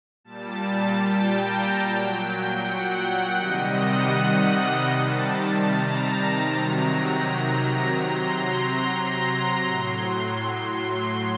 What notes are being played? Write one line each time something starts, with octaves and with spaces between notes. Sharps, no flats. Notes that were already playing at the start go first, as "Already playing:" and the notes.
A#2 G3 A5
G5
A#5
A#2 F#3 G5
G5
F#5
C3 D#3 G3 D#5
F#5
C3 D#3 G3 A5
A#5
C3 D#3 F#3
C3 F#3 C6
A#5
A2 F#3 C6
C6
C6